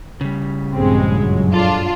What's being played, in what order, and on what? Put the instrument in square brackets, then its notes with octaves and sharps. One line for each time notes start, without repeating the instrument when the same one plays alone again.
[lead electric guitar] C#3 G3
[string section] A#1 G2 G#3 [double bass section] C4
[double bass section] F#2 F#3
[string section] D4 F4 [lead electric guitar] A4